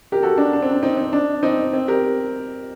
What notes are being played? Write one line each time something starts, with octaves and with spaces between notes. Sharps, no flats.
G4 A#4
F#4 A4
D4
D4
C4
D4
C4 D#4
C4
D4
C4 D#4
C4
G4 A#4